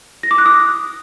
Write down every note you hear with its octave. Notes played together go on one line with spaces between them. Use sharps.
A#6
D6
F#6
D#6